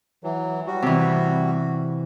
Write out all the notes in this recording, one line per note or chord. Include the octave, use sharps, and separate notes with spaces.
E3 F#3
G3 F#4
C3 E3